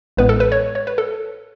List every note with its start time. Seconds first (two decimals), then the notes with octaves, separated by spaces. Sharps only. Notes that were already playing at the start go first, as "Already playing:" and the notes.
0.17 A1 A2 G#3 B3 B4
0.29 A4
0.40 B4
0.52 C#5
0.75 C#5
0.87 B4
0.98 A4